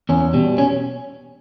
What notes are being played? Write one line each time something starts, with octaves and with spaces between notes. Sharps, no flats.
E2 C#4
B2 G3
C#4